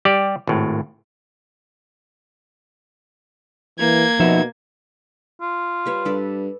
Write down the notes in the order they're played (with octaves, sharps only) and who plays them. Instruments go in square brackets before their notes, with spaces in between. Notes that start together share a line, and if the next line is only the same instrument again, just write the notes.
[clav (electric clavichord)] G3 G4 D5
G#1 A2
[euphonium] E3 [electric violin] A#3 G#6
[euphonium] B2 [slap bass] F3 [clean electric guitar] D#4 F#4 E5
[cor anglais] F4
[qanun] G3 B4 C#5
[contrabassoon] G2 [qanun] A4 B4 D5